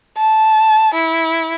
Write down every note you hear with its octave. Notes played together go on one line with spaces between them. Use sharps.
A5
E4